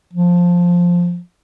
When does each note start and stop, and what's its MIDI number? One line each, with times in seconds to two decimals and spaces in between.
0.13 1.19 53